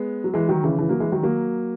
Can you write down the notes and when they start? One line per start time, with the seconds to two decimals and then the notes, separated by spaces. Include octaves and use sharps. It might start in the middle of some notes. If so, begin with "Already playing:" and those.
Already playing: G#3 B3
0.24 F#3
0.34 E3 G#3
0.49 D#3 F#3
0.63 C#3 E3
0.79 C#3 E3
0.89 F#3 A#3
1.00 E3 G#3
1.12 D#3 F#3
1.23 F#3 A#3